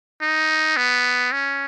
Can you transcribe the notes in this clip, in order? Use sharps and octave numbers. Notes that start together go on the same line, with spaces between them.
D#4
B3
C#4